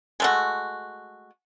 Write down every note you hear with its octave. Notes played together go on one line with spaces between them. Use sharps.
G#3 A3 F#4